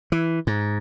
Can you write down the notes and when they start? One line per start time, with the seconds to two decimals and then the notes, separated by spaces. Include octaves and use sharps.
0.12 E3
0.47 G#2